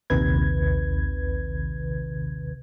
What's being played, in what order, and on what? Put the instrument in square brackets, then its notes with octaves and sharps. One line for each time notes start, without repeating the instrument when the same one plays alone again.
[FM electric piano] A#1 D#2 C3 D#3 B4 G#6